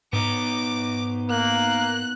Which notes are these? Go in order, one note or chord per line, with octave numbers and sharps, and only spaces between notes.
G#2 B3 D#4 D6
A#3 F#6